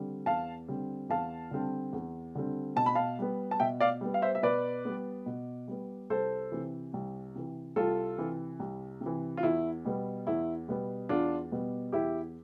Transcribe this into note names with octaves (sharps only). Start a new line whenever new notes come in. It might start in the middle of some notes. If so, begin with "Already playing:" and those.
Already playing: D3 G3 C4
E2 F5 A5
D3 G3 C4
E2 F5 A5
D3 G3 C4
E2
D3 G3 C4
B2 A5
B5
F5 A5
G3 B3
A5
B2 E5 G5
D5 F5
G3 B3
F5
C5 E5
E5
B2 B4 D5
G3 B3
B2
G3 B3
C2 A4 C5
C3 E3
C2
C3 E3
C2 F4 A4
C3 E3
C2
C3
E3
F4
E2 E4
B2 G3 B3
E2 E4
B2 G3 B3
E2 D4 F4
B2 G3 B3
E2 E4 G4